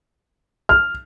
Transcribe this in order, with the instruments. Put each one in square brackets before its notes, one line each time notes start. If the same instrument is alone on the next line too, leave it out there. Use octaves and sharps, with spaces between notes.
[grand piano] F6